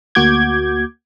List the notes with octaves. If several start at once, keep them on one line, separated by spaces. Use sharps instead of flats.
D2 A#3 F#4 D6 G6 G#6